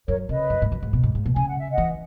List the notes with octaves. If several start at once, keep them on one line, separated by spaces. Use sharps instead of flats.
F#2 A#4 C#5
C#3 B4 D#5
F#2
G#2
F#2
G#2
B2
G#2
G#2
B2
C#3 G#5
F#5
E5
D#5 F#5
E3